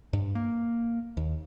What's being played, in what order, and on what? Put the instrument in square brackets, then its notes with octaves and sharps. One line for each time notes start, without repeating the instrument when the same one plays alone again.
[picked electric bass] G2
A#3
D#2